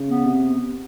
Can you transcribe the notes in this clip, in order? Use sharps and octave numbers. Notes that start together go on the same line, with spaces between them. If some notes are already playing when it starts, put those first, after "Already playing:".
Already playing: C#3
B3
C3